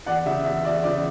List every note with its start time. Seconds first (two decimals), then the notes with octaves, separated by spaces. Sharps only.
0.06 E2 D5 F#5
0.26 C#3 E5
0.45 E2 E5
0.64 E2 D5
0.84 C#3 D5